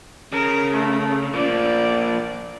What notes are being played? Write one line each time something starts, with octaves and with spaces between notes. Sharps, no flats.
C#3 A#4
A3
A#2 F3 D5